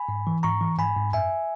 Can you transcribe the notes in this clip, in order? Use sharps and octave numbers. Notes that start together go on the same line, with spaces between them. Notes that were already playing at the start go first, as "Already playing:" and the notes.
Already playing: G#5 B5
G#2
E3
G#2 A#5 C#6
E3
G#2 G#5 B5
G#2
F#2 E5 G#5